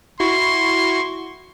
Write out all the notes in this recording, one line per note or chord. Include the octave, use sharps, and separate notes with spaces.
E4 F#4 C6 C#6